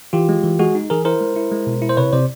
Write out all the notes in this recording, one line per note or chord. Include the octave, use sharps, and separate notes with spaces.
E3 F4 G4
G#3
E3
G#3 F#4 G#4
D#4
E3 G#4 A#4
E4 A#4 C5
G#3
E4
G#3
B2
E4
C5
C3 B4 C#5
C3 C5 D5